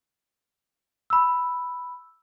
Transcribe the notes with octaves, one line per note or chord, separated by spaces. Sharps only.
B5 E6